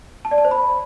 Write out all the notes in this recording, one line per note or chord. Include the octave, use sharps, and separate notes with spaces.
A5
D5
A5
C5
B5